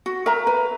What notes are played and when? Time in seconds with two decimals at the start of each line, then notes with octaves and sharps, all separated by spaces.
0.06 F#4
0.26 A#4 E5 A#5
0.47 B4